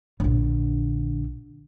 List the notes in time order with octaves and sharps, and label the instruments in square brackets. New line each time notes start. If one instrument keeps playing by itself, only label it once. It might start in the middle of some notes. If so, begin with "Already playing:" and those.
[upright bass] A#1 D3